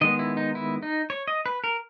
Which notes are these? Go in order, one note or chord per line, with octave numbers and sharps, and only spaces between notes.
D#3 G#3 B3 D#5
E4
D#4
E4
D#4
C#5
D#5
B4
A#4